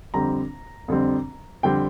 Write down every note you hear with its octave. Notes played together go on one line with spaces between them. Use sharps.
F2 D3 G3 C4 A#5
F2 D3 G3 C4
F2 D3 G3 C4 G5